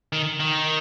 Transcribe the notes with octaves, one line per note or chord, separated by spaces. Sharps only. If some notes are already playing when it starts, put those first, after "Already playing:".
D#3
D#3